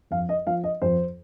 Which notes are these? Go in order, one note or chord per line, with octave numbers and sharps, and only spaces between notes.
F2 F5
D#5
F3 F5
D#5
F2 C5